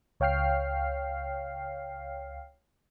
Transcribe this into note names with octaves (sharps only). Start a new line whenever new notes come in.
C#2 C#5 F5 G5 F6 C7